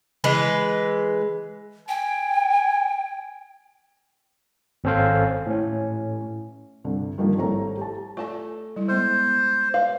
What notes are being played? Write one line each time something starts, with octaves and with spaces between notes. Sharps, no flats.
E3 G#3 B4
G5 G#5
G#1 C4 C#4 A4 C5 F5
A2 C#4
C2 G2 D3
G2 D3 D#3 F3 G3 A#3
G#1 G3 A3 E4 C#5 A#5
G4 A5
A3 F4 D5 A5
G3 E4
G#3 B3 C5
B4 C#5 E5 F5